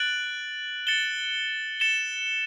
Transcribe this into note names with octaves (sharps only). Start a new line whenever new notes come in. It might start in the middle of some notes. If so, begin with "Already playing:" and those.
Already playing: F#6 A6 D7 F#7
A6 C#7 E7 G7
A6 C#7 E7 G7